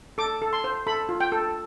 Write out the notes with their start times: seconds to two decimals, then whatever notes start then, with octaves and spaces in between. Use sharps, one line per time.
0.18 A4 D6
0.42 A4
0.53 C6
0.64 C5
0.87 A4 B5
1.09 F4
1.20 G5
1.32 A4